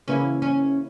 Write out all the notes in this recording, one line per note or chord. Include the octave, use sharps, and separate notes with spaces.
C#3 E3 A#3 C#4 E4
C#4